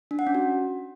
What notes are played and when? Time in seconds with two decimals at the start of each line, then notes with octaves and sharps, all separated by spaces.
0.11 D4
0.19 F#5
0.27 C#4
0.35 F#4